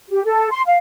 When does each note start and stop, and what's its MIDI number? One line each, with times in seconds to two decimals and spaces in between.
0.10 0.23 67
0.24 0.48 69
0.51 0.62 84
0.66 0.76 77